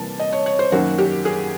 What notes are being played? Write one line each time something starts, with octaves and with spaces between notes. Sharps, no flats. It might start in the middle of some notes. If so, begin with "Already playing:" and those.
Already playing: C3 E3 G3 A#3 A5
D#5
C#5
C#5
C5
F#2 D#3 F#3 A#3 F#4
G4
G#4